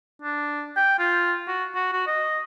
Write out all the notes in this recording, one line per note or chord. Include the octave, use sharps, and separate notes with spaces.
D4
G5
F4
F#4
F#4
F#4
D#5